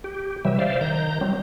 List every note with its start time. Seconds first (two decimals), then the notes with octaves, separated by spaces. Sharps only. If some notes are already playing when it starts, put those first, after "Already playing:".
0.04 G4
0.45 C3 E3 F#3 G3 E5
0.59 C5 D5 E5 F5
0.81 D#3 A#5 G6
1.21 F#3 G3 C4